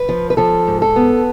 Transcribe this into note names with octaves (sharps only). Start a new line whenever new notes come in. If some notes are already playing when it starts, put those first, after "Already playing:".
Already playing: B4
F3
B4
F3 A4
G#2
A4
B3